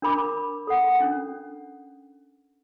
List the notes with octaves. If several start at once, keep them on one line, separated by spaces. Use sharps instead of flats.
D4 A#4 B5 D6
A4 F#5
C#4 D4